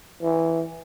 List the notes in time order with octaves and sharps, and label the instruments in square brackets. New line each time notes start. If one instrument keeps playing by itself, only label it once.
[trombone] E3